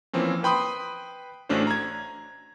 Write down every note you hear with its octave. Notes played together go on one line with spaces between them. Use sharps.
E3 F3 A#3 C4 C#4
B4 G5 B5 C6 D#6
A1 A3 C#4 D4 F#4 C5
A#5 G#6